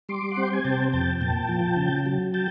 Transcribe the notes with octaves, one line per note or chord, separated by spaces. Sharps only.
G3 C6 D6
F#5
C4
G5
G#5
C3 G5 A5
F2 G5 A5
A#2 G5 A5
F3
C#3
F#3
G5 A5